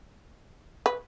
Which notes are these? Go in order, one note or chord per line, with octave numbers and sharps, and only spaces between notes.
B4